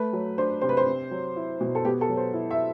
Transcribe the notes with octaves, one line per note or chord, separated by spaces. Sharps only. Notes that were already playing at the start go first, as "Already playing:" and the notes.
Already playing: A3 B4
F#3
D4 C5
C3 C5
B4
C5
C4
F#3
E4
B2
A4
B3 G4
A4
F#3
C5
E4
E5